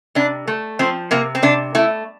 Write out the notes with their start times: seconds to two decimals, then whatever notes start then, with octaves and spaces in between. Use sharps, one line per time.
0.15 C3 D4
0.47 A3
0.79 F3 C4
1.11 C3 A#3
1.35 C4
1.42 C3 D4
1.75 A3 E4